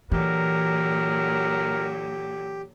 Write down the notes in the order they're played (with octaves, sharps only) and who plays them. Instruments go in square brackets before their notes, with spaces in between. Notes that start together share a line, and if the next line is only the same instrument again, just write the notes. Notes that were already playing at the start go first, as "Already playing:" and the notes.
[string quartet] A#2 D3 F#3 [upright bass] E3 [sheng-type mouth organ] G4 [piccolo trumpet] A#4